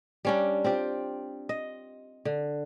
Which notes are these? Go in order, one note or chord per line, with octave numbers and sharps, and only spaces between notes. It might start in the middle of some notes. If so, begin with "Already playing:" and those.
G3 C#4 D4
C4 F4 G4
D#5
D3